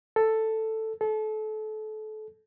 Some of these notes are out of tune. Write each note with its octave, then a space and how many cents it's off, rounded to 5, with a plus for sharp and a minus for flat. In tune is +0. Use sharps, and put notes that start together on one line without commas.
A4 +5
A4 -30